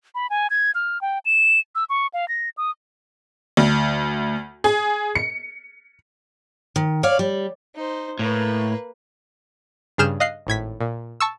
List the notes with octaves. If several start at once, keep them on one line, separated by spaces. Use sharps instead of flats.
B5
G#5
G#6
F6
G5
E7
E6
C#6
F5
A#6
D#6
D2
G#4
C#7
D#3
C#5 D5 F5
G3
D#4 C5
A2 A#3 B4
G2 C#3 G#4 F6 G6 E7
D#5 F5 F#6 C7
G#1 A2 G#6 B6
A#2
A5 C#6 E6